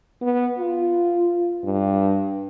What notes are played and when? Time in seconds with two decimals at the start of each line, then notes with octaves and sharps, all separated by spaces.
0.22 B3
0.59 F4
1.64 G2